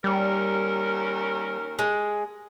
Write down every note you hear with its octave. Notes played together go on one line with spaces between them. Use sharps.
D#2 G3 C#4 A#4
G#3